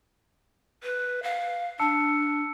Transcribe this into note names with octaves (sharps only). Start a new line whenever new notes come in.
B4
F5
D4 A5 E6 C#7